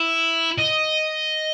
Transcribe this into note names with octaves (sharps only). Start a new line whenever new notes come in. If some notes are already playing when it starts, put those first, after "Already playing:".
Already playing: E4
D#5